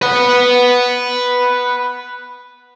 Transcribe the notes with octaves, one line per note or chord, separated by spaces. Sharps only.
B4 F#5